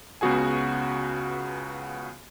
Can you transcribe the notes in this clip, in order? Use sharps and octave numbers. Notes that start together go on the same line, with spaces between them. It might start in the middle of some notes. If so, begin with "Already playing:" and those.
C#2 C#3 B3 F#4 G#4 G#5